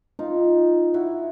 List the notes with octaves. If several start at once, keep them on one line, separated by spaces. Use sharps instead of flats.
D#4 F4
E4 F#4